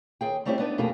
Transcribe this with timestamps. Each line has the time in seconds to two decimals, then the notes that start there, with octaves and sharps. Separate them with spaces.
0.21 D#2 G#4 G5
0.45 G3 A3 C4 C#4 E4 G4
0.59 B3 D4 D#4 B4
0.78 F2 B2 A3 A#3 G4 G#4